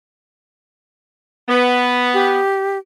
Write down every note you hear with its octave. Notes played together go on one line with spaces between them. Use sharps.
B3
G4